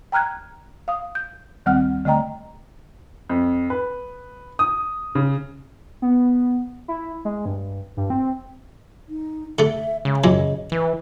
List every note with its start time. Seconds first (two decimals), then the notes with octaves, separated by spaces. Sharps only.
0.12 G5 A#5 F6 F#6 G#6
0.88 F5 D#6
1.15 G6
1.66 D2 D#3 G3 C4 F#5 F6
2.05 D3 A3 D#5 G5 A#5
3.29 F2
3.70 B4
4.59 D#6
5.15 C#3
6.02 B3
6.88 E4
7.25 G#3
7.46 G2
7.97 G2
8.10 C4
9.09 D#4
9.59 D3 A3 E5
10.05 C#3 G#3
10.24 F#2 A#2 E3 D#5
10.72 E3 B4